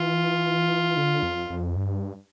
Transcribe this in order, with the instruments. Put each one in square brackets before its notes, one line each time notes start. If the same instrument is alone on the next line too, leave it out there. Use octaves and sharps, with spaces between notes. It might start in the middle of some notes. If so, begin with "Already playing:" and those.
Already playing: [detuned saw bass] E3 [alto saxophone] F4
[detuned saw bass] D3
F2
F2
G2